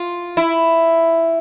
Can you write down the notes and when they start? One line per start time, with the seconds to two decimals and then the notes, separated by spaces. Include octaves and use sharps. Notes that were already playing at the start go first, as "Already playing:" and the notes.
Already playing: F4
0.37 E4